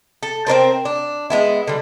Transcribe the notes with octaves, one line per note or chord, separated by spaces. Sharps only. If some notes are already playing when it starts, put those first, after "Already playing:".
A4
C4 D4 A#4 C5
D4
G#3 B3 E4
D3 G3